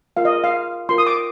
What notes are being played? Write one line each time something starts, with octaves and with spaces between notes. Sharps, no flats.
F4 A#4 F5
D#5
F5
F4 A#4 C6
D#6
D6